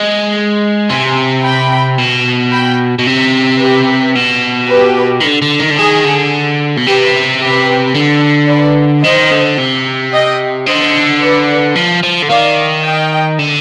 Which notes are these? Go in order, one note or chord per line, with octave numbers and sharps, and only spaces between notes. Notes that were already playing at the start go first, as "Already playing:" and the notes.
Already playing: G#3
C3 G#5 C6
G5 B5
B2
G5 B5
B2
C3
G4 B4
B2
G4 B4
D#3
D3
D3
D#3
D3
D#3 G#4
D3
B2
C3 G4 B4
G4 B4
D3
B4 D5
D#3 C5 D#5
D3
C3
D#5 G5
D3 C5 D#5
B4 D5
F3
F3
D3
D#3 D5 F5
D#5 G5
D3